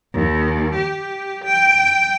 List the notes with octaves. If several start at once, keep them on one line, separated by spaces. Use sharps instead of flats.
D#2
G4
G5